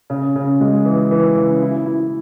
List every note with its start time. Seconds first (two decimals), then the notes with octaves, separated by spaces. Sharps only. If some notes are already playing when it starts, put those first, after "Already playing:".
0.10 C#3
0.36 C#3
0.60 G#3
0.85 E3
1.11 E3
1.37 C#3
1.62 E4
1.86 E4